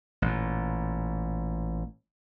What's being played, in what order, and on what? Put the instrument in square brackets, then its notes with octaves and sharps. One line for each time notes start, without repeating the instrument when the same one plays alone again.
[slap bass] A1 A#2